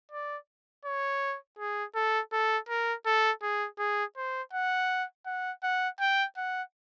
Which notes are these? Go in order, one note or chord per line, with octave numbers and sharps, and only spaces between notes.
D5
C#5
G#4
A4
A4
A#4
A4
G#4
G#4
C5
F#5
F#5
F#5
G5
F#5